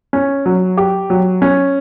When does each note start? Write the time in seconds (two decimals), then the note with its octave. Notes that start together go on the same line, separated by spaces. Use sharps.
0.13 C#4
0.46 F#3
0.77 G4
1.10 F#3
1.42 C#4